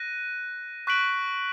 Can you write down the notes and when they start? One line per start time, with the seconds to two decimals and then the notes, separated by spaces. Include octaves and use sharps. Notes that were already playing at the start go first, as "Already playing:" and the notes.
Already playing: F#6 A#6 D#7
0.87 C#6 F#6 B6 D7 F#7